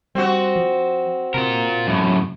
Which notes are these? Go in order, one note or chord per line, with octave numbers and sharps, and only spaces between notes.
G3 C4 F#4
F3
C3 F4 A#4
F#2 A2